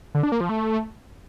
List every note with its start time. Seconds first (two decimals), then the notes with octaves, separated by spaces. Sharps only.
0.15 D3
0.23 D4
0.32 A#3
0.41 F3
0.49 A3